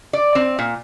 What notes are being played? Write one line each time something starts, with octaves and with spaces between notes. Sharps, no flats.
D5
C4
A#2